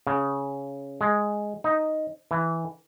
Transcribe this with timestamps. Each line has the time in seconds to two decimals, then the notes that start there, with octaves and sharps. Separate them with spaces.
0.07 C#3
1.01 G#3
1.64 D#4
2.31 E3